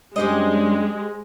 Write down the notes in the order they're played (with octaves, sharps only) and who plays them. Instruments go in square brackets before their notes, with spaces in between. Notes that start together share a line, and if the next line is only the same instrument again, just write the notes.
[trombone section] F#2 G3 D4 [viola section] G#3 [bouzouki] G4 C5 D#5